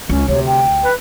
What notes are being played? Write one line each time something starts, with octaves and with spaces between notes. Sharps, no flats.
C#2 C#4
D2 C3 C#5
G5
B4